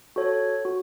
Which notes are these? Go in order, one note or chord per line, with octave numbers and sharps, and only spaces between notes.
F#4 A4 C#5
F#4